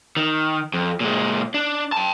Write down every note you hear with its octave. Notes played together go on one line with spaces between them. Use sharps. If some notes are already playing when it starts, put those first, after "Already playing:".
D#3
F2
A#2 G#3
D4
G5 A5